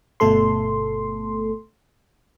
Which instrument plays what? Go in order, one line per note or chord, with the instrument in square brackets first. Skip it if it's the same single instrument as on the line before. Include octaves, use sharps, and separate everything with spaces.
[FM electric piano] G1 B2 A3 A4 C6